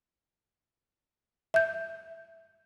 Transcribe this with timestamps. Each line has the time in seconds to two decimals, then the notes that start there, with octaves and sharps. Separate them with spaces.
1.54 E5 G6